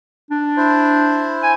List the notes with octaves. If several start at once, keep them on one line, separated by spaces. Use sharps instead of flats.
D4
E4 C5
G#5